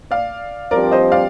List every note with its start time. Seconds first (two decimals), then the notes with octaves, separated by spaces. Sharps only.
0.11 D5 F5
0.71 G2 F3 C4 G4 A#4 D5
0.92 C5 D#5
1.12 D5 F5